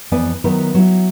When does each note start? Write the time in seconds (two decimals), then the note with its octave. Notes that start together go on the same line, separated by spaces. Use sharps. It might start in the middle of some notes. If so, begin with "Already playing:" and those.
0.12 F2 E3 B3 D5 G#5
0.44 D#3 F#3 B3 E4
0.74 F#3 E4